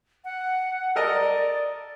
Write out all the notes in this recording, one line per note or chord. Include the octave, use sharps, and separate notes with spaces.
F#5
A4 A#4 D5 D#5